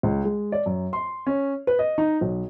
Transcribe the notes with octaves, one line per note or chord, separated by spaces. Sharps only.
C#2
G#3
D5
F#2
C6
C#4
B4
D#5
D#4
B1